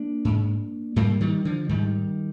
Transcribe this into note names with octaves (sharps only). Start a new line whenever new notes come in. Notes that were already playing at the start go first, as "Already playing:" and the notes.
Already playing: A#3 D4
G#2
G#2 G3 A#3
D#3 G3
D3 F3
G#2 D#3 G3